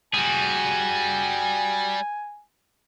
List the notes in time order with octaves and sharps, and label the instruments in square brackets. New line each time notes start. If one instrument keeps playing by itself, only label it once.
[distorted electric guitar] G3 [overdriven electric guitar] F#4 G#4 [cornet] G#5